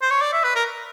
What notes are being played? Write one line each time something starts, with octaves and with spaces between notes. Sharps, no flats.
C5
C#5
D5
E5
B4
A#4